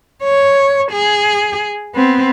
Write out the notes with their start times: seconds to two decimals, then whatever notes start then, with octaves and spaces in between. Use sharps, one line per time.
0.23 C#5
0.92 G#4
1.95 B3 C4